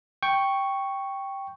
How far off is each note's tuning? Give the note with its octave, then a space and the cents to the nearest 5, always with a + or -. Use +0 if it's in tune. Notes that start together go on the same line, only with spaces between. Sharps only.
G5 +0 C#6 +0